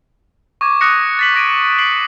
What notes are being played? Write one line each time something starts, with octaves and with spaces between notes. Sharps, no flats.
C#6 D6 G#6
D#6 F#6 A#6 C#7
A6 B6 F#7
D6 A#6 D7 D#7
C7 D7 F#7